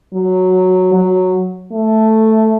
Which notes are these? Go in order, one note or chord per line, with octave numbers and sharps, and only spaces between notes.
F#3
F#3
A3